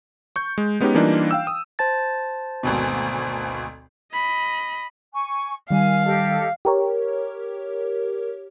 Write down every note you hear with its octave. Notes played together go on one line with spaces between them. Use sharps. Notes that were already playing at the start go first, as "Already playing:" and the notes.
C#6 G6
G#3
G#3 B3 C#4 D#4 G4
E3 G3 A#3 D4 D#4 F4
F5 G5 E6
D#6
C5 A5 A6
G#1 D2 B2
D#5 B5
G#5 C#6
D#3 G3 F5 G#5
G4 A4 D#5
G4 A#4 C#5